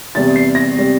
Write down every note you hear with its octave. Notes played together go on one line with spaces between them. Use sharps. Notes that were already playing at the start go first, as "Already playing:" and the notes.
E2 C3 G3 A6
C7
A#6
C3 G3